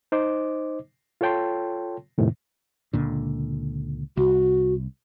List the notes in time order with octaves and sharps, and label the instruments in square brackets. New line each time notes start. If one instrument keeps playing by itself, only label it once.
[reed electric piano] D#4 C5 D#5 D6
F4 A4 C#5 G5 A5 C6
F2 A2 C3 D#3
[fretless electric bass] C#2 A#2 D3
[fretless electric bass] C2 [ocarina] F#4